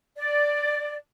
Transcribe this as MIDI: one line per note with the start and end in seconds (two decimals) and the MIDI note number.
0.17 0.95 74